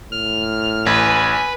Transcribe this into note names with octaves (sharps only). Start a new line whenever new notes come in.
A2 F6
A1 B4 G#5